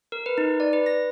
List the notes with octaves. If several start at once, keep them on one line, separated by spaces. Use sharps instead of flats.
A#4
B4
D#4
D5
B4
A#6